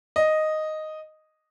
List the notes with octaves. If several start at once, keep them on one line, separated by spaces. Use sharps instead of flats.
D#5